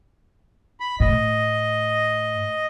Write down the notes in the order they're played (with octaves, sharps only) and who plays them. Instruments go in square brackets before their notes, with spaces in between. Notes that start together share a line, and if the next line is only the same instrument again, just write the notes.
[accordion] B5
[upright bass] A2 [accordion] D#5